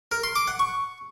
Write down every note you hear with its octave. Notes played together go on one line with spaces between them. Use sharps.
A#4
C6
D6
F#5
C#6